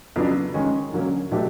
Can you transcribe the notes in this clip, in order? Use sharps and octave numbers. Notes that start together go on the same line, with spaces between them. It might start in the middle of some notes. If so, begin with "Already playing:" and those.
F2 C#3 F#3 B3 D4
D#3 G#3 C#4
D3 F#3 A#3 C#4
B2 F#3 A3 D4 G4